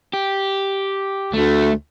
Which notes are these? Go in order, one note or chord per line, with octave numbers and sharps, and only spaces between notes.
G4
D2 A3